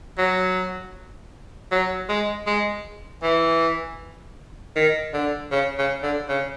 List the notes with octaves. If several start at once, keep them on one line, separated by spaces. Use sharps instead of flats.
F#3
F#3
G#3
G#3
E3
D#3
D3
C#3
C#3
D3
C#3